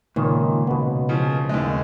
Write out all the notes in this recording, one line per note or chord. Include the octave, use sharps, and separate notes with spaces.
C#2 A#2 D#3
B2 B3
C#3 F3
D#2 G#3 D#5